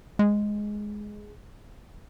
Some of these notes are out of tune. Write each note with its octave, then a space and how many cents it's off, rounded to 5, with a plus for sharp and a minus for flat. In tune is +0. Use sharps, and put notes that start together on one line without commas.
G#3 +5